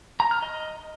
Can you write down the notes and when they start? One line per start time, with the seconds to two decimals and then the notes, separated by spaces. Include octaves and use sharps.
0.20 A#5
0.31 F6
0.42 D#5